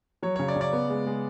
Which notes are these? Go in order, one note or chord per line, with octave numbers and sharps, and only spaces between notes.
F#3 C#5
C#3 C#5
D5
C#3
D5
B3
G#3
G#3